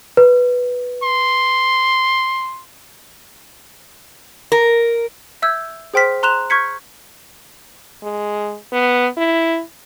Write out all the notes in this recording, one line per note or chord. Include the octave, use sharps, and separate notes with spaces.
B4
C6
A#4
E5 E6 G6 G#6
G#4 C5 G5 C6 F6 B6
A#5 C6 F#6 E7 F7
C#6 F6 G6 G#6 B6 C#7
G#3
B3
E4